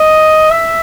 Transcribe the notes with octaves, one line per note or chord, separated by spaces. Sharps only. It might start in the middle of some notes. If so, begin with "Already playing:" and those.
Already playing: D#5
E5